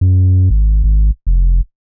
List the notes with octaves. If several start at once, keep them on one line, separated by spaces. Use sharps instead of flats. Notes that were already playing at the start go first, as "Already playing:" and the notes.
F#2
G#1
G#1
F1